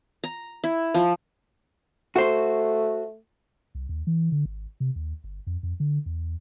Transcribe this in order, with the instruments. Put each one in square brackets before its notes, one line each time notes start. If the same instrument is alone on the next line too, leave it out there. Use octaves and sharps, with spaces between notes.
[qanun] A#5
E4
F3
[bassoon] A3 [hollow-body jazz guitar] F#4 C5
[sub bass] C2
D#2
E3
D3
G#1
C3
D#2
G1
F2
F2
D3
E2